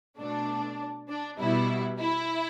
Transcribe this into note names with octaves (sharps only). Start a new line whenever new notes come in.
B2 A3 D4
D4
B2 G3 B3 E4
E4